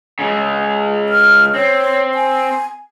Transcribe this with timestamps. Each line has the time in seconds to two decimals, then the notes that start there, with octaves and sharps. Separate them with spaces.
0.19 C#3 G#3
1.09 F6
1.55 C4 C#5
2.15 G#5